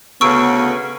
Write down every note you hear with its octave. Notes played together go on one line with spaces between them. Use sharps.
D2 C#3 B3 C#6 E6 D7